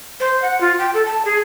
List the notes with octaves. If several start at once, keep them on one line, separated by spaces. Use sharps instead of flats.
C5
F#5
F4
G5
A4
A5
G#4